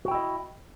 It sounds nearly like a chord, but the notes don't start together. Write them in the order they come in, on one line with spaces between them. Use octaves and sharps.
F#4 G5 E4 D#5